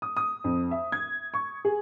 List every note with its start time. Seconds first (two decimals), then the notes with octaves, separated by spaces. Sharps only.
0.02 D#6
0.17 D#6
0.44 F2
0.71 E5
0.92 G#6
1.34 C#6
1.65 G#4